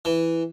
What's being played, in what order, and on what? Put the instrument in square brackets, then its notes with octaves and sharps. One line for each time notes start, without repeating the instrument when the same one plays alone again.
[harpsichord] E3